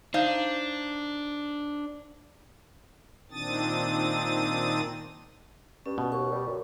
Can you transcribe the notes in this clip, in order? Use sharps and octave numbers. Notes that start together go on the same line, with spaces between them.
D4 D#4 C5 F5
A#2 D#3 C4 D4 D#6 A6
G2 C#4
B2
D#2 C#6
G3
F#2